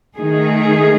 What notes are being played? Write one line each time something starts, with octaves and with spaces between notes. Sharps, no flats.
D#3 A3 D#4 G#4